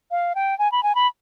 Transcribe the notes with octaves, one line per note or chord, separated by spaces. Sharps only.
F5
G5
G#5
B5
G#5
B5